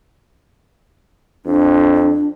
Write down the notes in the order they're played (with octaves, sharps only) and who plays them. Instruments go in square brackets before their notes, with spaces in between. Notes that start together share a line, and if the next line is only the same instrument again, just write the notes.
[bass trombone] F2 [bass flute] D4